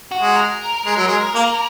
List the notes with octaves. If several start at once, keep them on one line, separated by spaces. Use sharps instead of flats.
F#4
G#3
A#4
G#3
F#3
G#3
A#3